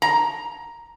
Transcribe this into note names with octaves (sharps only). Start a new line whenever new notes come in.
A#5